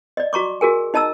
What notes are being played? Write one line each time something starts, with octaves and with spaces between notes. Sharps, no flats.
D5 D#5
F#4 A#5 C#6 D6
F#4 G#4 A#4 G#5
D#4 D#5 A5 A#5 E6